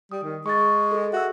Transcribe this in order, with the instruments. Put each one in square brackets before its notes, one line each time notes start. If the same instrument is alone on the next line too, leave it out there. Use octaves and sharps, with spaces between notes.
[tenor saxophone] G3 [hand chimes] D#6
[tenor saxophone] D#3
[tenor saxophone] G#3 [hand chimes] C#6 A6
[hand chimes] G#4 A4
[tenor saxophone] F#4 [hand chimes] E5 E6